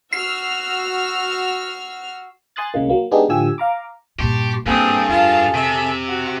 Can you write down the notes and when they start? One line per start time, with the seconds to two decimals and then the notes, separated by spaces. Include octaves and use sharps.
0.13 F#4 E6 F6 C7
2.56 G#5 C6 D#6 F#6 A6
2.74 C2 C#3 G#3 A#3
2.89 F#3 A#3
3.11 G#3 B3 D4 D#4 G4 G#4
3.29 A2 D3 F3 G4 G#5 E6
3.58 F5 A#5 D6
4.19 G2 A#2 G4 A5 C6 C#6
4.66 G2 A#3 C4 G#4 A4 D#6
5.09 F2 F4 A5
5.54 C3 E5
6.08 F#4